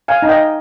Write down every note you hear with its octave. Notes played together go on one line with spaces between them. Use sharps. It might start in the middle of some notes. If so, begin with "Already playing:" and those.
F5 G#5
D#4
D#5 G5